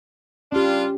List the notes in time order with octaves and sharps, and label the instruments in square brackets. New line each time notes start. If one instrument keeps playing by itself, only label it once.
[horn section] G3 D4 F4 [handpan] C#4 G4